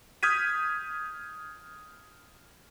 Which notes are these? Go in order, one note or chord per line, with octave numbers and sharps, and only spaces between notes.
D#6 F6 G6 G#6 B6 D#7